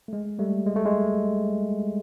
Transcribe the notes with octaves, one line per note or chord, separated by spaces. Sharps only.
A3
G#3
G3 A3
G#3
A3
G#3